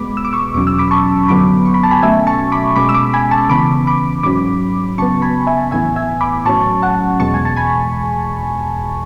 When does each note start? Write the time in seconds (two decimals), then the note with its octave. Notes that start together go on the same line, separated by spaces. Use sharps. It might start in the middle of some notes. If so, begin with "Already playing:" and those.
Already playing: B2 G#3 B3 B5 D6
0.17 E6
0.25 D6
0.33 C#6 E6
0.54 E2 B2 F#3 C#4 D6
0.67 E6
0.78 B5 D6
0.91 A5 C#6
1.28 F#2 D3 F#3 B3 B5 D6
1.66 C#6
1.74 B5
1.83 A5
1.91 G#5 B5
2.02 B2 F#3 A3 C#4 E5 G#5
2.27 A5 C#6
2.52 B5 D6
2.76 B2 G#3 C#4 B5 D6
2.89 E6
2.94 B5 D6
3.14 G#5 B5
3.31 A5 C#6
3.50 C#3 E3 B3 B5 D6
3.87 B5 D6
4.23 G#2 F#3 C#4 B5 D6
4.98 C#3 F#3 B3 A5 C#6
5.22 G#5 B5
5.47 E5 G#5
5.71 A2 E3 B3 E5 G#5
5.96 E5 G#5
6.21 B5 D6
6.45 A2 F#3 C#4 A5 C#6
6.82 F#5 A5
7.20 E2 B2 G#3 A5 C#6
7.34 G#5
7.45 A5
7.56 G#5 B5